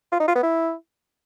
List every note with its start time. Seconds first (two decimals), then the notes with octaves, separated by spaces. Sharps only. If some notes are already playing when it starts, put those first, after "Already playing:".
0.12 F4
0.20 D#4
0.28 F4
0.35 B3
0.43 E4